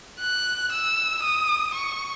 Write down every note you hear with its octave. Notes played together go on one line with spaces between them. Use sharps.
F#6
E6
D#6
C#6